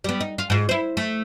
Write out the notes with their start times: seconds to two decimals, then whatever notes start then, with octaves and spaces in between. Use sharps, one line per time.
0.04 G3 B3
0.21 D#4
0.38 F4
0.50 G#2 F4
0.69 E4 C5
0.97 A3